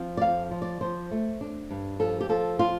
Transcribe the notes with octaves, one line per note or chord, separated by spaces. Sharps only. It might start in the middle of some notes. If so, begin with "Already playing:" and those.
Already playing: F3 C4
D5
F2 F5
F3
D5
F3 C5
A3
D4
G2
F3 A4
G4
F3 A4
F4